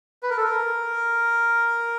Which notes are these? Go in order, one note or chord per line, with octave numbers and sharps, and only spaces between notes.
B4
A#4
A4
A#4